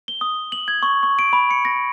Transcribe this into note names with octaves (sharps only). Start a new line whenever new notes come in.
G7
D#6
F#7
G#6
C#6
C#6
D7
B5
C#7
A#6